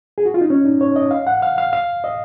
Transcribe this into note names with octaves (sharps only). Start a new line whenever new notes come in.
G#4
F#4
F4
D#4
C#4
D#4
C#5
D#5
F5
F#5
F5
F5
F5
D#5